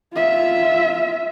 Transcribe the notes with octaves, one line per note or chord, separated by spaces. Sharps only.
F4 E5